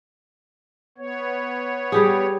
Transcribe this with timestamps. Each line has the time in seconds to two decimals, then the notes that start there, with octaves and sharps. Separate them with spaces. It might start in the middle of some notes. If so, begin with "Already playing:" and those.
0.98 B3 C#5
1.92 G3 G4 G#4